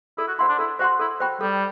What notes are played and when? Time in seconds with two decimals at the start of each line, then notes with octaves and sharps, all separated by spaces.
0.18 E4 A4
0.28 F#4
0.39 E4 C5 F#5 C6
0.49 D4
0.59 E4 A4
0.79 F#4 C5 F#5 C6
0.99 E4 A4
1.20 F#4 C5 G5 B5
1.41 G3 A4